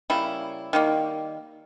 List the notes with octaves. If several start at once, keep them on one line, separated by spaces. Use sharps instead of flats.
C#3 G3 A#3 E4
D#3 G3 A#3